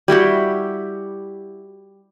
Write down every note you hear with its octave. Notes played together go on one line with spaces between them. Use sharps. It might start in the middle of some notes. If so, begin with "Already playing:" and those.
G3 E4 F#4 G4